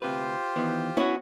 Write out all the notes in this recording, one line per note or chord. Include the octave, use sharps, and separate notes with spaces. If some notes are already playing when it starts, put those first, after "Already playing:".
D2 C3 F4 G4 B4 C5
D#3 E3 B3
B3 C#4 E4 F#4 C#5